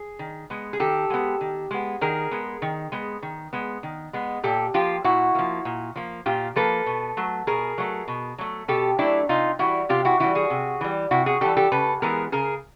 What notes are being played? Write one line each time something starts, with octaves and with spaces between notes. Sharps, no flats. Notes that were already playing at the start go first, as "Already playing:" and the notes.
Already playing: G#4
D#3
G#3 B3
G#4
D#3 G4 A4
G#3 B3
D#3
G#3 B3
D#3 G#4 A#4
G#3 B3
D#3
G#3 B3
D#3
G#3 B3
D#3
G#3 B3
A#2 G4 A4
F3 A#3 F4 G4
A#2 E4 F#4
F3 A#3
A#2
F3 A#3
A#2 F4 G4
F3 A#3 A4 B4
B2
F#3 A3
B2 G#4 A#4
F#3 A3
B2
F#3 A3
B2 G4 A4
F#3 A3 D4 E4
C3 D#4 F4
E3 G3 E4 F#4
C3 F4 G4
E4 F#4
E3 G3 E4 F#4
F#4 G#4
C3
E3 G3
C3 E4 F#4
F#4 G#4
E3 G3 G4 A4
G4 A4
C#3 A4 B4
E3 G#3 B3 G#4 A#4
C#3 G#4 A#4